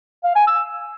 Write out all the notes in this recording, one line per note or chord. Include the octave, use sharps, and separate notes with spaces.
F5
G#5
E6